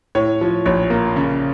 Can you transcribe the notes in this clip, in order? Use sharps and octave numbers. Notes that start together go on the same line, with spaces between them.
A2 C#5
F3
A#1 C#5
A#3
C#3